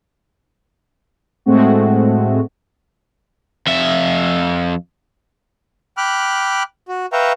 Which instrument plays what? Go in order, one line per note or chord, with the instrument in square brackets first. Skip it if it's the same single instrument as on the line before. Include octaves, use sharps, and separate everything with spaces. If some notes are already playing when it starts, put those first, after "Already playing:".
[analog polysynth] A2 G#3 A3 C4 F#4
[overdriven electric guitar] F2 E5
[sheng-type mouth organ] G5 B5 D6 F6 F#6
F#4
B4 E5 F5 G5 A#5 C#6